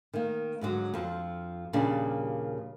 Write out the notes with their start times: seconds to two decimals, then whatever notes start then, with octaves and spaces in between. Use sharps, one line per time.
0.13 D#3 A#3
0.61 G#2 D3 F#3
0.94 F2 F3
1.73 D#2 A#2 C#3 F3 G3 D4